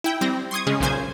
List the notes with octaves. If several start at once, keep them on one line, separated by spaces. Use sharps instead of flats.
E4 G5
G3 C4 A#6
C6 C#6 D#6 G#6
C#3 G#3 C#4 G#4
B1 A#2 C#3 C5 G#5 G#6